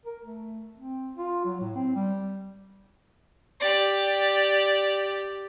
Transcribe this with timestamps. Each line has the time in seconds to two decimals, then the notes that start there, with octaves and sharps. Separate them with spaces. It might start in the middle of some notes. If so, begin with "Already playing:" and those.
0.06 A#4
0.24 A3
0.77 C4
1.16 F4
1.45 F#3
1.61 A2
1.75 C4
1.96 G3
3.60 G4 D5